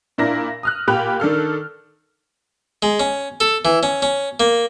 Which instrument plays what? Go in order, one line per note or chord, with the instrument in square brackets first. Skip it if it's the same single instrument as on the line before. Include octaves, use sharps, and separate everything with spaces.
[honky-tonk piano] A#2 D4 E4 A#4 A#6
D#6 F6 F#6
A#2 G4 G5 B5 F#6 F7
D#3 D4 A4 F6
[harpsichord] G#3
C#4
A4
E3
C#4
C#4
A#3